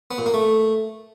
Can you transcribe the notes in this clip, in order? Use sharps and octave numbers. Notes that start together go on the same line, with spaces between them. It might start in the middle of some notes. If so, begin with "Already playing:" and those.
B3
A#2
A#3
A3